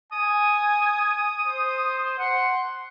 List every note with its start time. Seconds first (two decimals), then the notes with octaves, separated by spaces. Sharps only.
0.12 G#5 D#6
1.47 C5
2.19 F#5 C6